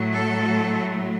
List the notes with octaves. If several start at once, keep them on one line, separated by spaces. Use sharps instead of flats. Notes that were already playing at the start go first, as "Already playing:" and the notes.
Already playing: A2 F#3 A3
A4